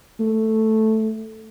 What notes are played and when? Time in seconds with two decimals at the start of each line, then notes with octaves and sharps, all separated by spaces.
0.20 A3